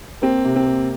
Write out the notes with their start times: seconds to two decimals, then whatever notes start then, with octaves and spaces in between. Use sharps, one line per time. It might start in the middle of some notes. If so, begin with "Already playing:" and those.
0.22 A#3 C4
0.44 C3
0.56 C4
0.67 A#3